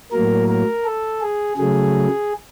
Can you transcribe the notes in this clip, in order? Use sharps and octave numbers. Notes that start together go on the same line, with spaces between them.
A2 F#3 A#3 A#4
A#4
A4
G#4
C#3 F#3 A3 G#4